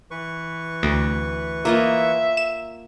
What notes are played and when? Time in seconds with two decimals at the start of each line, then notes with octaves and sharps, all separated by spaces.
0.11 E3 B4 C#6
0.83 D2
1.65 A#3 F4 D#5 E5
2.37 E7